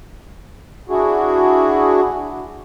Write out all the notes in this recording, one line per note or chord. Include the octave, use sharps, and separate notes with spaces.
D4 E4 F#4 G#4